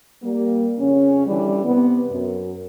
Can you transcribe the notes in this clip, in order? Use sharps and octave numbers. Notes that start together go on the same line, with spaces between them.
G3 A#3
F2 C#3 C#4
D3 E3 G3
C3 B3
F#2